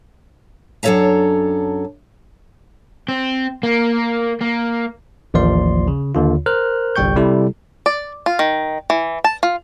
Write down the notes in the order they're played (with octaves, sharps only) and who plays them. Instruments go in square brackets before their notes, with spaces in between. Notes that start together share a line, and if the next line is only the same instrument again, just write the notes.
[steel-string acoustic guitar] F#2 D4 A4 C#5 E5 A#5
[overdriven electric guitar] C4
A#3
A#3
[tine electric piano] A1 D#2 F3 D5 C6
C#3
D#2 D3 F4
A#4 C5 F6 F#6
G1 C2 G3 G5 C#6 G6
C3 G3 E4 G4 A4
[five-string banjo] D5
F4
D#3
E3
A5
F4